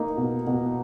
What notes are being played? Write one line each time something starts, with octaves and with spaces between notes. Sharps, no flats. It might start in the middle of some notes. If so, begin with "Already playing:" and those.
Already playing: A#3 D#4
B2
B2